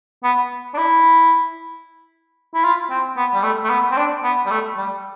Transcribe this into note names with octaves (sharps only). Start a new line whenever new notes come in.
B3
D4
E4
E4
F4
C4
B3
G3
A3
A3
B3
C4
D4
B3
G3
A3
G3